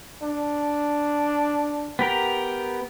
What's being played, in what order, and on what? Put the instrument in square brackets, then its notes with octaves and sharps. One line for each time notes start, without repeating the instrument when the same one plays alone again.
[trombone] D4
[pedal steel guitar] B3 G4 A#4